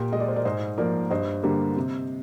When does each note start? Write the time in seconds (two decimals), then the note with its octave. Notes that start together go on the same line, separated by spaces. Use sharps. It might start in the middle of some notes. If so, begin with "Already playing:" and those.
Already playing: A#2 G4 A#4
0.12 G#3 D#5
0.20 D5
0.28 C5
0.36 A#4 D5
0.45 G#2 C5 D#5
0.78 F3 A#3 A#4 D5
1.11 G2 C5 D#5
1.43 D3 G3 A#3
1.76 C3